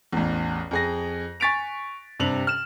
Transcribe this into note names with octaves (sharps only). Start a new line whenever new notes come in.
A1 E2
F2 G#4 A#6
G#5 C#6 A6 B6 D7 F7
G2 C3 F7 F#7
F6 E7